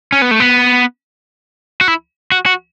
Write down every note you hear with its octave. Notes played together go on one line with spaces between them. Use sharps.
C#4
B3
A3
B3
F#4
E4
F#4
F#4